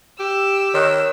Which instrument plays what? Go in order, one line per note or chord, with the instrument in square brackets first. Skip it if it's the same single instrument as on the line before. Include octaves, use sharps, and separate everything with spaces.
[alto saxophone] G4 [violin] E6
[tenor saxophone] D#3 [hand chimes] C#5 F#6